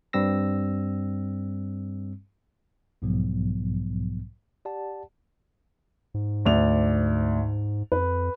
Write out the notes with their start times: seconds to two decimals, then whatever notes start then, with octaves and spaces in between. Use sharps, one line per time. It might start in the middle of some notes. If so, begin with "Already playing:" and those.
0.13 G2 G3 C4 E6 A#6
3.02 B1 G#2 B2 F3 F#3 B3
4.65 G4 D5 F#5 A5
6.14 G#2
6.45 D2 D5 F7
7.92 F2 B4